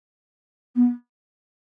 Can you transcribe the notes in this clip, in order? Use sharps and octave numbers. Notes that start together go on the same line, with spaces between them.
B3